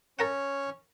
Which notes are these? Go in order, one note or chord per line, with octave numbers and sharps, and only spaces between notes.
C#4 A4 A#4 C#5 F#5